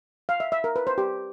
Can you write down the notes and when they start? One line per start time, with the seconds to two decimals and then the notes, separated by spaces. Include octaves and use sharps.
0.29 F5
0.40 E5
0.52 E5
0.64 A#4
0.76 B4
0.87 C5
0.98 G4